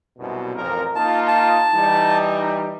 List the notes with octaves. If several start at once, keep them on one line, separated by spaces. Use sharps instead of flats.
C2 F#2 B2
A1 F2 A#4
A#3 D#4 F4 A5
A5
E3 G3 D#4